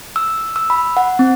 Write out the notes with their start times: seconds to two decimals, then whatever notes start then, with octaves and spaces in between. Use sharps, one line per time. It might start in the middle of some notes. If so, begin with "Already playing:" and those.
0.16 E6
0.56 E6
0.70 B5
0.97 F#5
1.19 C4